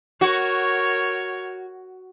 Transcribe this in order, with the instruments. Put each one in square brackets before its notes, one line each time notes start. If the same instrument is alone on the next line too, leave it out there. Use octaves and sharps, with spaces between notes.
[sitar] F#4 [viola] A#4 C#5